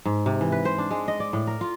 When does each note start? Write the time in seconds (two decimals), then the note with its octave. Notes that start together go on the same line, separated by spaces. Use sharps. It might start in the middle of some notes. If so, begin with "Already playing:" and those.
0.05 G#2
0.26 C3
0.41 E3
0.52 B4
0.65 C5
0.78 D4
0.91 G#3
1.08 D#5
1.20 D5
1.33 A2
1.47 A#4
1.61 F4